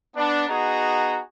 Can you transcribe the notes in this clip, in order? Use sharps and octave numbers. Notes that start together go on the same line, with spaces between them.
B3 D4
B3 D#4 F#4 G#4 A#5